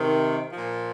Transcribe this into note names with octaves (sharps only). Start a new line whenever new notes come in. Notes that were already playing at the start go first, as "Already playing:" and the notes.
Already playing: C3 D#3
A#2 F3